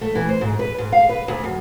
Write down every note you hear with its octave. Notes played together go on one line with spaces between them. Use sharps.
A3
E3
C5
G#2
B4
G#2
F5
B4
D2
F#2